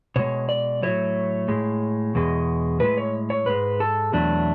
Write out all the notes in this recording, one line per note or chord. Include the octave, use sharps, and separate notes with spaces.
B2 G#3 C#5
D5
A2 F#3 A3 C#5
A2 G#3
E2 B2 G#3
A2 G#3 B4
C#5
C#5
G#2 G#3 B4
A4
E2 B2 F#3 A3 D4